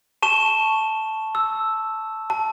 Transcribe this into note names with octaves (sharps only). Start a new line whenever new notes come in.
A5 C#6 E7
E6
A5